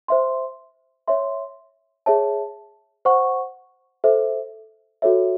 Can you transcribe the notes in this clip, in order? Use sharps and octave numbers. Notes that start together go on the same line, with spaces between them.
C5 E5 C6
C#5 E5 C6
G#4 C#5 E5 A5
C5 F#5 C#6
A4 C5 E5
F#4 A4 C#5 E5